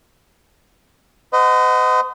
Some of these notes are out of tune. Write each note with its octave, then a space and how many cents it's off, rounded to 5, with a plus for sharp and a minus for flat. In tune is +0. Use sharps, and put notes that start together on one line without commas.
C5 -45 D#5 +0 F#5 +0